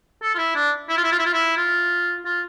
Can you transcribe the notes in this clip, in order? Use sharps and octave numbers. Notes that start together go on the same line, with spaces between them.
A4
F4
E4
D4
E4
F4
E4
F4
E4
F4
E4
F4
F4